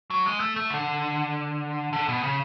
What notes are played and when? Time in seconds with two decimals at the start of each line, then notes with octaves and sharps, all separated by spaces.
0.10 F#3
0.26 G#3
0.40 A3
0.56 A3
0.70 D3
1.93 D3
2.09 B2
2.23 C#3